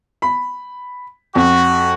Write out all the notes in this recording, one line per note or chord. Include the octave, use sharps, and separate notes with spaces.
B5
F2 F#4